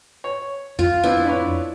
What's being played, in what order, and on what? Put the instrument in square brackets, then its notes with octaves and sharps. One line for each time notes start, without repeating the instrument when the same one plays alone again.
[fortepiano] C#5
[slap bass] F2 [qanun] F4
[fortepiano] B3 C4 D4 [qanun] E4
[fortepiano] D4 B4 C#5